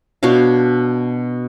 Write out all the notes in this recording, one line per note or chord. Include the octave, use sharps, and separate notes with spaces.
B2 D4 C#5 F5